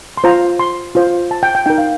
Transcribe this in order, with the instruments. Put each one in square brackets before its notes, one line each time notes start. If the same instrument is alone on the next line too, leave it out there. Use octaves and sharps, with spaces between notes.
[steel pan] C6
F4 C5 A#5
C6
F4 C5
A5
G5
G5
D#4 A#4 G5
F5